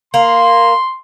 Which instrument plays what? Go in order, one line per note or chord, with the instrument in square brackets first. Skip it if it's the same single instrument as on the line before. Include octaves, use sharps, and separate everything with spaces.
[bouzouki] A#3 [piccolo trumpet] C6